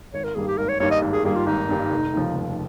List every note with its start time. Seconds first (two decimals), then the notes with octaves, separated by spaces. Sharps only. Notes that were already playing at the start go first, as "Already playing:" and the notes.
0.14 G#1 C#5
0.24 A#4
0.35 G2 D#3 G3 A#3 G#4
0.47 G4
0.58 G#1 A#4
0.69 C#5
0.80 G2 D#3 G3 A#3 C#5
0.91 D#5
1.02 G#1
1.13 G#4
1.24 G2 D#3 G3 A#3 G#4
1.35 F4
1.47 G#1 D#4
1.69 G2 D#3 G3 A#3
1.92 F1
2.13 D#2 C#3 F3
2.35 F1